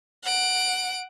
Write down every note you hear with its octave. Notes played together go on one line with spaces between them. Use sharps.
F#5 D7